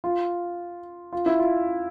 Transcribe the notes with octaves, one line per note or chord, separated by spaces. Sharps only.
F4
F4
E4
F4